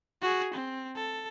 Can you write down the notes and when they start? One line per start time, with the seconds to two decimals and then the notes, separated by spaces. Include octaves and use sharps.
0.22 F#4 G#4
0.54 C4
0.96 A4